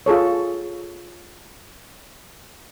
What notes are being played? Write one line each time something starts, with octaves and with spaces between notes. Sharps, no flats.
F4 G#4 A4 C#5